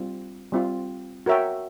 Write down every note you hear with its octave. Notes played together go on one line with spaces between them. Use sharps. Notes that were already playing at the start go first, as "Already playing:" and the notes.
Already playing: G3 C4 F4
G3 C4 F4
F#4 A#4 C#5 E5 G5